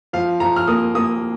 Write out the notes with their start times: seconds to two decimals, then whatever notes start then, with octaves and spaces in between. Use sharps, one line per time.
0.13 F3 F5
0.40 F3 A#5
0.56 F6
0.68 A#3 D#6
0.95 A#3 D#6